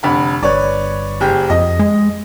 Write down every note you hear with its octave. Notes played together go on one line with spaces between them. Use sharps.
F1 D3 B5
G1 B4 C#5 D5
F#1 G4 G#4
F2 D#5
G#3